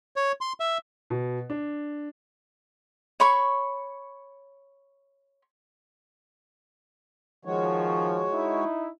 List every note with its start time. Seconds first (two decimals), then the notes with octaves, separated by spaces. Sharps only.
0.16 C#5
0.41 C6
0.60 E5
1.10 B2
1.50 D4
3.20 C#5 B5 C#6
7.45 D#3 F3 G#3 F#4 C#5
8.33 D#4 E4